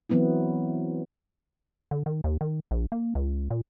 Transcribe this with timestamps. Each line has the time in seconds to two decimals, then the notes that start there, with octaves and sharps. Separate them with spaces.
0.09 E3 F#3 B3 C4 E4
1.91 D3
2.06 D#3
2.24 D#2
2.41 D#3
2.71 A#1
2.92 A#3
3.15 C#2
3.50 A#2